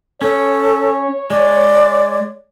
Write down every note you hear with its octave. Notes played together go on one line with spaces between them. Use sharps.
C#4 A4 C#5
G#3 D5